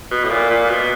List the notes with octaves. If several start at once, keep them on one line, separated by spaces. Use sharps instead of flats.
B2
A2
A#2
A#2
B2